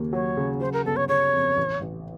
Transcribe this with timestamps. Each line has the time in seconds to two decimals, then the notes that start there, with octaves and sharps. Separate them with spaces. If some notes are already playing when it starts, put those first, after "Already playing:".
Already playing: D#2 C#3 A#3
0.13 F#3 C#5
0.37 C#3
0.60 F#3 C5
0.73 A#4
0.85 G1 A4
0.96 C#5
1.08 C#3 C#5
1.33 F2
1.57 A1
1.81 A1